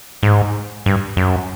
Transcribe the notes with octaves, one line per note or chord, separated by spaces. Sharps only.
G#2
G2
F#2